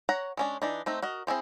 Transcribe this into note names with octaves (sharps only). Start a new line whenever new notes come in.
C#5 F#5 A#5
G#3 C#4 D4
E3 D4 D#4
A3 C4 D#4
F#4 A#4 D#5
C4 E4 G#4 C5